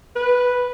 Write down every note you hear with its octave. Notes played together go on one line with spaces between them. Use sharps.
B4